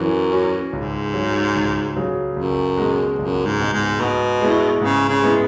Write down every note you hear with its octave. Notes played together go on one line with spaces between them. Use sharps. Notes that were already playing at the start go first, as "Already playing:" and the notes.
Already playing: F#2 E3 C#4
C#4 F#4
C#2 G#2
C#3 F#3
C#2
C#3 F#3
C#2 F#2
B2 G#3
C#2 F#2
G#2
B2 G#3
G#2
G#2 B2
G#3 B3 E4
G#2 C#3
C#3
G#3 B3 E4